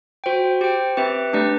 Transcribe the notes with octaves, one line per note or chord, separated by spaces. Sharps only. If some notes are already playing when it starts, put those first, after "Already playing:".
F#4 C5 G5
G4 C5 G5
C4 G4 B4 E5
A3 D4 G4 B4 D5